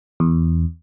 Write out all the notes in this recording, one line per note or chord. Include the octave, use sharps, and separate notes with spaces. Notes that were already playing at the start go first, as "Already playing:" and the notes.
E2